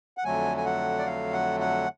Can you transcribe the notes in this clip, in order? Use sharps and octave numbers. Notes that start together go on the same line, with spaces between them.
F#5
F2 D3 F#3 A3 G#5
G#5
F#5
D5
F5
F#5
F#5